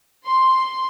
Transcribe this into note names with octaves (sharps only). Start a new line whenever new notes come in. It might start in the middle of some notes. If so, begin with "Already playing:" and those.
C6